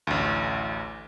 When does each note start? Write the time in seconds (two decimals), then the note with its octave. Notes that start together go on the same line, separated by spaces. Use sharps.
0.07 A1 D2